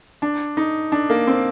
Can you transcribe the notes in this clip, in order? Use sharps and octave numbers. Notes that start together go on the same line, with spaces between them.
D4
D#4
D4
A#3
C4